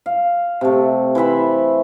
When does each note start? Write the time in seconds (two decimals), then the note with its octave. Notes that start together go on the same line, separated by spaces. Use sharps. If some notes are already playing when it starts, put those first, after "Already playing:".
0.06 F5
0.61 C3 A3
1.15 E3 C5 E5 B5